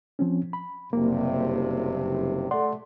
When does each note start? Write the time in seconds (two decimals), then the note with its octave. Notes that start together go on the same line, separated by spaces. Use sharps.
0.19 F3 C4 C#4
0.53 B5
0.93 F#1 G2 C3 A#3
2.51 A3 D5 F#5 C6